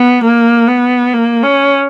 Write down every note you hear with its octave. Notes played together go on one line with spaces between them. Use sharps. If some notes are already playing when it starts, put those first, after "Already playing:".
Already playing: B3
A#3
B3
A#3
C#4